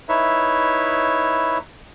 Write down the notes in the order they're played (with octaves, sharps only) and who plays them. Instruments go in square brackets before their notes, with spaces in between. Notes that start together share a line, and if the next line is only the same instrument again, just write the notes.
[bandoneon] D#4 E4 B4 C#5 E5